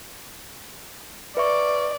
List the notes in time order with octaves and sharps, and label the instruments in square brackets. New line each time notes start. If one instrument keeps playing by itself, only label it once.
[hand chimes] B4 E5 C#6 [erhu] D5